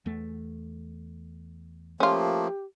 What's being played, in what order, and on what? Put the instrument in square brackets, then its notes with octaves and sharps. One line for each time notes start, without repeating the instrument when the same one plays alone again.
[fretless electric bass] E2 A3
[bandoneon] F3 A3 A#3 [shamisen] C#4 F4 [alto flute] G4